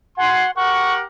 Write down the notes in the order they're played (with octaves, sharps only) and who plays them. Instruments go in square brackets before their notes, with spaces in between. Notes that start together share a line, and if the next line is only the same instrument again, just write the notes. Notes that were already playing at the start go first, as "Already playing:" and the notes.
[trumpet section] F#4 G#5 C6 [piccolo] F#5
[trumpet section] G4 A#4 F#5 [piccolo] C#6